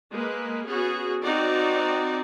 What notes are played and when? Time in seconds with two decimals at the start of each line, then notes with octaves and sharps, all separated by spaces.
0.11 G#3 A#3 B4
0.67 B3 C#4 F#4 G#4
1.23 C4 D#4 F#4 D5